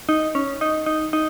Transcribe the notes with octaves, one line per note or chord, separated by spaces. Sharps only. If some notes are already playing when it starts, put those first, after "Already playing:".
D#4
C#4
D#4
D#4
D#4